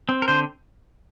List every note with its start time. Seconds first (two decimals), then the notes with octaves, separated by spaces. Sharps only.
0.09 C4
0.22 A#4
0.28 D3 C5